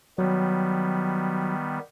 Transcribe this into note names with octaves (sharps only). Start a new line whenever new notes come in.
D#3 F#3 G3 B3